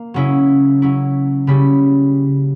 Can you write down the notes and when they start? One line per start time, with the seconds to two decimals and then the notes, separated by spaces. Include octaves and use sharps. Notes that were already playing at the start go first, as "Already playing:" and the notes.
Already playing: A#3
0.14 C#3 F#3 C#4 E4
0.82 F#3 C#4 E4
1.47 C#3 G3 C#4 E4 B5